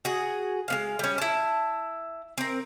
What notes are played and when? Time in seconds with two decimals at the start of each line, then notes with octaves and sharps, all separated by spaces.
0.05 F#4 G#4
0.68 G#3 B3 F5
0.99 G3 C#4
1.18 E4 A5
2.38 C4 A#4